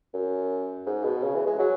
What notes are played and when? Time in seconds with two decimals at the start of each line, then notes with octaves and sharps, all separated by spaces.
0.14 F#2
0.87 G#2
1.04 B2
1.23 C#3
1.35 E3
1.46 G#3
1.59 F#3